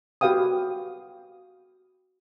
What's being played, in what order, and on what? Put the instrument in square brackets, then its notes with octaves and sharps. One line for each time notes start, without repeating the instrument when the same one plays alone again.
[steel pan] F#4 G4 B4 F5 G5 D#6